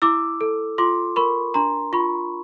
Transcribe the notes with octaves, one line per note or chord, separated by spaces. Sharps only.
E4 D6 E6
A4
F4 C6 D6
A#4 B5 C#6
D4 A#5 C6
F4 B5 C#6